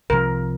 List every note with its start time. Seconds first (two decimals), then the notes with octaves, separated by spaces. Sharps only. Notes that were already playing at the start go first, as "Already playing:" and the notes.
0.10 C2 C3 F3 A#4